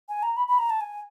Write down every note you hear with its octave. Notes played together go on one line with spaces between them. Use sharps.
G#5
A#5
B5
B5
A#5
A5
G#5